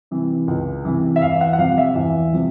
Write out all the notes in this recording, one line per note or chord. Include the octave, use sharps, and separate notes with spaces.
C3 E3
C#2
C3 E3
E5
E2 F5
F#5
F#5
C3 F3 F5
E5
E2
C3 F3